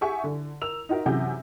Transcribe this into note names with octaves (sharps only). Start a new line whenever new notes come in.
G4 G#4 E5 F#5 G#5 C#6
D3
A#4 E6 F7
D#4 F4 F#4 A#4 E5
F#2 C3 E3 F#4 G#4 G6